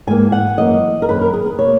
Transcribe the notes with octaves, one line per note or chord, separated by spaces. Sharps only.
G#2 E3 A#3 G#5
F#5
F#2 E3 A#3 D#5
A#4
F#2 D#3 A#3 B4
A#4
G#4
B4
B2 A#3 C#5